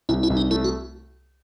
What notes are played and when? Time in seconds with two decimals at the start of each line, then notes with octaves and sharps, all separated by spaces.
0.09 C2 E4
0.23 E4
0.30 C2
0.37 D#4
0.51 A3 E4
0.64 F#4